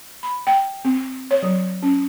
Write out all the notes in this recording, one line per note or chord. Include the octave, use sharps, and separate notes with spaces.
B5
G5
C4
C#5
F#3
C#4